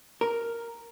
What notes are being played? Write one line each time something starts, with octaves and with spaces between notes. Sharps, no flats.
A#4